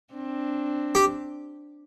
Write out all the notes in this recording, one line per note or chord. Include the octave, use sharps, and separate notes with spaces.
C4 D4
G4